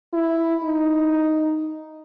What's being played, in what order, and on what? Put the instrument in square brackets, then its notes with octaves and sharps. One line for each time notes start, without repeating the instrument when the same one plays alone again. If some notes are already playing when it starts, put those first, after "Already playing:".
[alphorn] E4
D#4